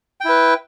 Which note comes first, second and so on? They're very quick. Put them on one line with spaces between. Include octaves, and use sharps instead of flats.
G5 E4 B4